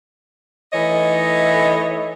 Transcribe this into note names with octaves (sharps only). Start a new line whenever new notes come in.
E3 A3 D#4 C#5 D#5